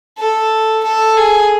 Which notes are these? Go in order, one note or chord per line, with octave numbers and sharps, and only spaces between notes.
A4
A4
G#4